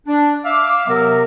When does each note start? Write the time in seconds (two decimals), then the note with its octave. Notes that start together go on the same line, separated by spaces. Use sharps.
0.07 D4
0.45 E5 F5 D6
0.88 C3 F#3 B3 A#4